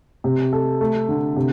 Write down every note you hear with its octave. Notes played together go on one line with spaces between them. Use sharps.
C3
A4
A3
D3
C3